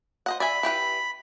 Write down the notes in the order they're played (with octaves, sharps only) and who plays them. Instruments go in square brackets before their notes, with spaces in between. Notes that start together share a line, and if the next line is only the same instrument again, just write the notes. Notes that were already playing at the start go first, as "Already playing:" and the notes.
[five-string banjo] C5 D#5 F#5
[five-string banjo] D5 E5 G#5 [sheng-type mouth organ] B5
[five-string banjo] E4 G4 B4